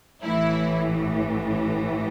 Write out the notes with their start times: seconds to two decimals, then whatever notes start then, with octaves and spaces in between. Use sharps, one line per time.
0.24 A1 A2 E3 E4